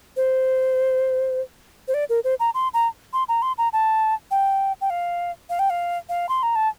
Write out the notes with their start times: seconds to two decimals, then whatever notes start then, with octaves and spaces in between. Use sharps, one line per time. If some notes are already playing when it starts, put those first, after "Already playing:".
0.17 C5
1.88 C5
1.94 D5
2.09 A#4
2.24 C5
2.40 A#5
2.54 C6
2.74 A#5
3.13 C6
3.29 A#5
3.42 C6
3.58 A#5
3.73 A5
4.31 G5
4.81 G5
4.90 F5
5.50 F5
5.59 G5
5.70 F5
6.09 F5
6.29 C6
6.43 A#5
6.56 A5